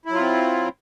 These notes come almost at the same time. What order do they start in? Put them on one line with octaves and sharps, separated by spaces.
E4 F#3 F4 C4